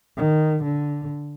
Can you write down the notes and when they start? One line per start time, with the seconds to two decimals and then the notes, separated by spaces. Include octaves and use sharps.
0.17 D#3
0.63 D3